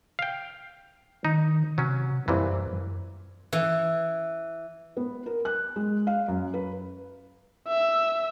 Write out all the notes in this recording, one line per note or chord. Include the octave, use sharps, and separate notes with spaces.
F5 G5
D#3 D#4
C3 F#3 C#4
C2 F#2 A#2 E3
E3
B3
A#4
F#6
G#3
F5
F#2
B4
E5